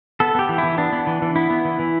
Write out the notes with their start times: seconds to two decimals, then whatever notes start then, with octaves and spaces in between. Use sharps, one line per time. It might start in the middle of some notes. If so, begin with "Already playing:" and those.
0.20 B3 A4
0.35 B3 G4
0.49 E3
0.58 E4
0.63 E3
0.78 B3 D4
0.93 B3
1.07 E3
1.22 E3
1.36 B3 E4
1.51 B3
1.65 E3
1.79 E3